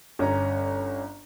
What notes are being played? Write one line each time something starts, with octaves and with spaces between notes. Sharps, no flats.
G1 C#4 A#5